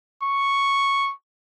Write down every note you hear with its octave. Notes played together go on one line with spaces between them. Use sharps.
C#6